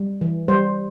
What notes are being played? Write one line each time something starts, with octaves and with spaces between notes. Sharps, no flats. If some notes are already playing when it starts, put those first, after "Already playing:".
Already playing: G3
E3
G3 C5